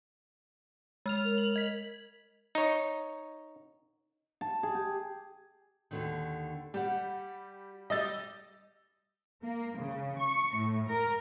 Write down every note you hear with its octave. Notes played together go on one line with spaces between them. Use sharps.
G#3 F6 F7
A#4
F#7
D#5 B6
D#4 C#5
A5
G#4
G4
D#2 D3 D#3
G3 G4 F#5
G3 G4 D#5 E6 A6
A#3
C#3
C#6
A2
A#4